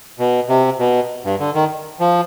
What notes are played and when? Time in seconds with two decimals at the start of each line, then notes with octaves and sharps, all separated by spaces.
0.19 B2
0.49 C3
0.79 B2
1.25 G2
1.40 D3
1.54 D#3
2.00 F3